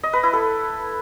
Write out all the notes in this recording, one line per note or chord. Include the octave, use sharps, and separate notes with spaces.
D#5
B4
E4
A4